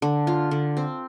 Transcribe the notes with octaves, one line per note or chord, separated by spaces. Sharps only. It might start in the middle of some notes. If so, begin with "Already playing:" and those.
D3
F4
D3
C4